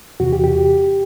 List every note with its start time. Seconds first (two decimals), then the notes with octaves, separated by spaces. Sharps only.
0.20 E2 C3 E3 F#4
0.33 G4
0.44 G4